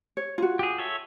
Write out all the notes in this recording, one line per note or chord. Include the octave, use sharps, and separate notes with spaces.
C#5
F4 F#4
G4 G#4
A4 C#5 E5